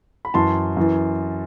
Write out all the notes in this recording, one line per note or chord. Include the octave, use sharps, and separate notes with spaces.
B5
F#2 E3 A5 C6
F#2 E3